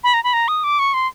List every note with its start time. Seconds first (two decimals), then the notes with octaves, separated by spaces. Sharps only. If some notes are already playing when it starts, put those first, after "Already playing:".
0.04 B5
0.14 A#5
0.24 B5
0.33 A#5
0.48 D#6
0.64 D6
0.79 C#6
0.94 C6